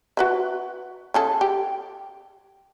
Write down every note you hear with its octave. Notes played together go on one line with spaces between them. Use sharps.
F#4 B4 E5
C#3 G#4 A4
G4